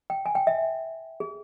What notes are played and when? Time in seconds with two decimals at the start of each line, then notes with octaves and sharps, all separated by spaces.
0.10 G5
0.26 G#5
0.35 G5
0.47 E5
1.20 G#4